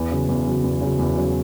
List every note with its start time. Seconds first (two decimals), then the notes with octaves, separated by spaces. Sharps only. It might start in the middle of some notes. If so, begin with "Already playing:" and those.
Already playing: E2
0.11 C#3 F#3
0.29 E2
0.46 C#3 F#3
0.64 E2
0.81 C#3 F#3
0.99 E2
1.17 C#3 F#3